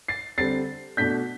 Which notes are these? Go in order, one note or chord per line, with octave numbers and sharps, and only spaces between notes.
A6 C7
D3 G3 C4 A6 C7
B2 A3 D4 G6 B6